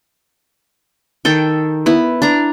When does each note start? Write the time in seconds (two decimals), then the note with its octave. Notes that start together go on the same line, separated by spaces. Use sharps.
1.25 D#3 A4 G5
1.86 B3 E4
2.22 D4 A#5